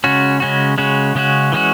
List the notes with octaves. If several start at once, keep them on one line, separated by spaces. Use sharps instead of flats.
C#3 G#3 C#4 F#4
C#3 G#3 C#4 F#4
C#3 G#3 C#4 F#4
C#3 G#3 C#4 F#4
E3 G#3 C#4 F#4